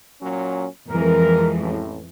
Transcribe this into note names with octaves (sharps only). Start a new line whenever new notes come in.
A#2 F#3 C#4
F2 E3 G#3 A#4
A1 A2